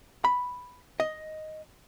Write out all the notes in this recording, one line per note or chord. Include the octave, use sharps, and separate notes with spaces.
B5
D#5